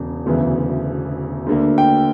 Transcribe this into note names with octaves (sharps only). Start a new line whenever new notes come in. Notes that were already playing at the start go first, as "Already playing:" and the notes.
Already playing: E1 C#3
E1 D2 C#3 E3 B3
D2 D3 A#3
G5